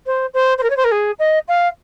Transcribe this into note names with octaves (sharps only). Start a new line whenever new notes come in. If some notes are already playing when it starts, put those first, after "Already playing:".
C5
C5
C5
A#4
C#5
C5
A#4
G#4
D#5
F5